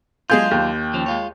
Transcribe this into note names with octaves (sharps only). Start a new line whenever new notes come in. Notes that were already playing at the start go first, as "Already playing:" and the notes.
F#3 G#3 D4 F4 G#4 G6
D#2
D#3 F3 C#4
G#3 F4 C#5